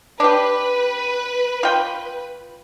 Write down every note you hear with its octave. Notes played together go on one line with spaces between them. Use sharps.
D4 G4 B4
F4 G5